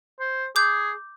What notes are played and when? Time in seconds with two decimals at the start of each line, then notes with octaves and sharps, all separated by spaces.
0.20 C5
0.56 G#4 D6 G6